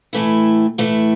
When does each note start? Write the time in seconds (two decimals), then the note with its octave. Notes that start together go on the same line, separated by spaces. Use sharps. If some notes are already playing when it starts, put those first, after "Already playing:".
0.13 A2 E3 A3 E4
0.78 A2 E3 A3 E4